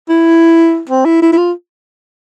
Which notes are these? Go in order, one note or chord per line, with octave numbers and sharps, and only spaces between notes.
E4
C4
E4
E4
E4
F4